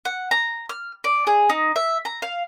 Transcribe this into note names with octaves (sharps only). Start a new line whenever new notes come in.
F#5
A#5
F6
D5
G#4
D#4
E5
A#5
F5